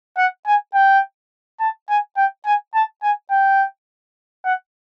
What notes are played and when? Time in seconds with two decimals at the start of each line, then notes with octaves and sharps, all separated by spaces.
0.18 F#5
0.47 G#5
0.74 G5
1.60 A5
1.89 G#5
2.17 G5
2.46 G#5
2.74 A5
3.03 G#5
3.31 G5
4.45 F#5